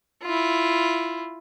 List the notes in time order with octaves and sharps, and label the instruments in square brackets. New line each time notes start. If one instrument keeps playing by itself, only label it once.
[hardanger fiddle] E4 F4